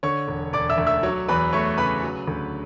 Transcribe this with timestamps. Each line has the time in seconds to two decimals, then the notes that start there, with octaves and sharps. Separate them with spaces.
0.03 D3 C#5 C#6
0.28 E1
0.53 E1 D5 D6
0.70 E5 E6
0.78 D2
0.87 E5 E6
1.03 F#3 C#5 C#6
1.28 E2 B4 B5
1.53 A3 C#5 C#6
1.78 C#3 B4 B5
2.03 F#3
2.27 D2